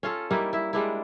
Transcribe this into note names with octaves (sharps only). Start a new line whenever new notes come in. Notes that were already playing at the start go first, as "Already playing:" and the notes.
C#4 F4 A4
G3 A#3 D#4 E4
E4 E5
G3 G#3 D4 E4